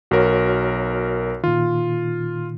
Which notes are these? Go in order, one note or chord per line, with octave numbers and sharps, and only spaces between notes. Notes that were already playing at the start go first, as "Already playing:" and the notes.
B1 F#4 A#4 C#5
A#2 D#3 F4